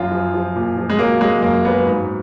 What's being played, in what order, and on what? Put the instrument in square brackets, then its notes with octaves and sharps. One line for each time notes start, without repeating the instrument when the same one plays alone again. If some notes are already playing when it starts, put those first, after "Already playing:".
Already playing: [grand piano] F#2 F4
F3
F3
A#2
F3
G#3
F#3 A#3
F#3 G#3
F#2 A#3
F#3 B3
G#2